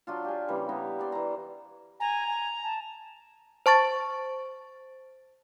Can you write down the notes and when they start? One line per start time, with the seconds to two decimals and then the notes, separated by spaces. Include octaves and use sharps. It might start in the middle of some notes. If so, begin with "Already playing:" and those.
0.07 F#3 D4 F4
0.25 G4 G#5
0.48 C#3 E3 G3 A#3
0.69 B3 E4 G4 A#5
0.99 G3 C5 D5
1.12 E3 A#5
2.00 G#5 A#5
2.27 G#5
2.63 A5
3.66 C5 A5 C#6 A6